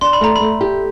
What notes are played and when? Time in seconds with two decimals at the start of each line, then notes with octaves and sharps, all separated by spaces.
0.01 D4 C6
0.13 B5
0.21 A3 A#5
0.36 A3 B5
0.61 G4